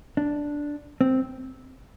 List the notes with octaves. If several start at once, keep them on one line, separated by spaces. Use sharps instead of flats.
D4
C4